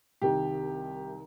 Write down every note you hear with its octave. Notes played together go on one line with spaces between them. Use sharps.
C2 C3 D#3 G4